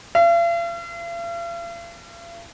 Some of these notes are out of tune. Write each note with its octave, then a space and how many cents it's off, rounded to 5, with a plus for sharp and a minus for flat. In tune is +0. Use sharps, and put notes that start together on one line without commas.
F5 -45